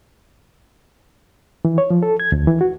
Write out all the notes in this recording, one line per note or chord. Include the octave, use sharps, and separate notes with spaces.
E3
C#5
F3
A4
G#6
D2
E3
F#4